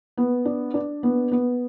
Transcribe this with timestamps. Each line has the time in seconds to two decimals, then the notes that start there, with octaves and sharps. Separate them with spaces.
0.17 B3
0.45 D4
0.74 D4
1.03 B3
1.32 B3